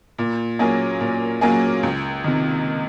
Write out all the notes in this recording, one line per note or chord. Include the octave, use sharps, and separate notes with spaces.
A#2
F#3 A#3 C#4 G#4
A#2
F#3 A#3 C#4 G#4
C#2
C3 D#3